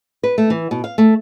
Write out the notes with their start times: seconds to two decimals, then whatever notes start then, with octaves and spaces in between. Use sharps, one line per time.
0.23 B4
0.38 A3
0.50 E3
0.71 B2
0.84 F5
0.98 A3